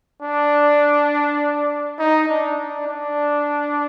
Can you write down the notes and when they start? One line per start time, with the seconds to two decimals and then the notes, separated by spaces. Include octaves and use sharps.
0.22 D4
1.99 D#4
2.28 D4
2.58 D4
2.87 D4